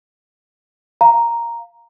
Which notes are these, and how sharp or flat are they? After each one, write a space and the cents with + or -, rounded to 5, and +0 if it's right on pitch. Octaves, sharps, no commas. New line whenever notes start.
F5 +0 A#5 +0